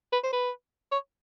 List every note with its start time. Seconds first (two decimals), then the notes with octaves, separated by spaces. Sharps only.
0.13 B4
0.23 C5
0.33 B4
0.92 C#5